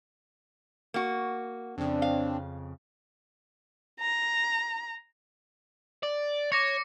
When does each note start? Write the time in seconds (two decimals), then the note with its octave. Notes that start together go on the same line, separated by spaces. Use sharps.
0.94 A#3 F#4
1.78 F2 C#3 C4 D4
2.02 F5
4.00 A#5
6.03 D5
6.52 C#5 D6 A#6 C#7